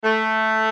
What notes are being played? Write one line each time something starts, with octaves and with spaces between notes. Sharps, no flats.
A3